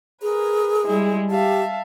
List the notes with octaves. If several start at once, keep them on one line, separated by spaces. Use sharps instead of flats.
G#4 A#4 B4
G3 G#3 E4
G4 E5 F5 A5